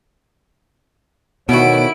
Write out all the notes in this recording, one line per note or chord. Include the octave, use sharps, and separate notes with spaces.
D2 B2 D#3 B3 E4 F#4 C#5 D7